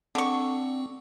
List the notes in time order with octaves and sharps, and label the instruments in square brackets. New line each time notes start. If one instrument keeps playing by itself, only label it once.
[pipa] D3 C#6 [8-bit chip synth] C4